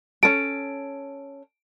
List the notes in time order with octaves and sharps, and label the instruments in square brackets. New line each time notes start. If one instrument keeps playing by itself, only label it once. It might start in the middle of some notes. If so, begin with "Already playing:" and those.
[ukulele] C#4 A4 [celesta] D7